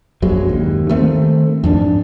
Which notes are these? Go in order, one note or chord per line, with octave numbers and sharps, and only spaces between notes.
A#1 F#2 F#3 G#3
D#2
D#3 A3 C4
F2 G#2 D4